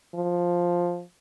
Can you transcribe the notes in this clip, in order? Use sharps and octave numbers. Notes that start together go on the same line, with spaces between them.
F3